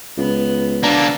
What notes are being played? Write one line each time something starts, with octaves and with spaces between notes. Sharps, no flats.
C#2 B3
D3 A#3 D4